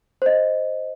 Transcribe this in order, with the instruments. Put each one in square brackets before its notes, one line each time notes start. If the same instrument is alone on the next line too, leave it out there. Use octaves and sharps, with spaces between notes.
[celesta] C5 D#5